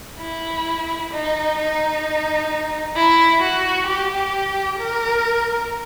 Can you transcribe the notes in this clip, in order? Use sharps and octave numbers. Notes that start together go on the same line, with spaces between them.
E4
D#4
D#4
E4
F#4
G4
A#4